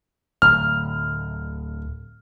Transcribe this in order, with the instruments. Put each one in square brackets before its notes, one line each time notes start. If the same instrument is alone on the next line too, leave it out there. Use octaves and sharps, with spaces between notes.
[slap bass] D1 [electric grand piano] F6